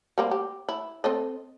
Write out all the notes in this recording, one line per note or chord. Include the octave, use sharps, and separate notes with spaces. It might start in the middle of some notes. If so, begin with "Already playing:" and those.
G3 A#3 C4
G4
E4
C4 A4 D#5